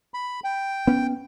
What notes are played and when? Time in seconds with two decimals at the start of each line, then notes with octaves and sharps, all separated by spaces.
0.14 B5
0.44 G5
0.87 B3 C#4